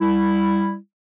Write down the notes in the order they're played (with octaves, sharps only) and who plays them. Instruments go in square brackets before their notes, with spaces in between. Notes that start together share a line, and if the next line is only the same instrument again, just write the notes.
[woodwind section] G3 E4